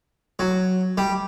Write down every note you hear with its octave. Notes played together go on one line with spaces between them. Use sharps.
F#3
G3